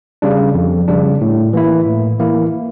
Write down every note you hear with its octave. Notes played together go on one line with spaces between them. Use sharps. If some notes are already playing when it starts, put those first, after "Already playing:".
C#3 G3 D4
F2
C#3 G3 D4
A2
E3 A#3 E4
A2
E3 A#3 E4